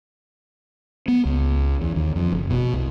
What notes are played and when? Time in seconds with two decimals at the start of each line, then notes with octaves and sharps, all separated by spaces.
1.08 B3
1.25 C#2
1.81 E2
1.96 D#2
2.16 F2
2.32 F#1
2.50 B2
2.74 C2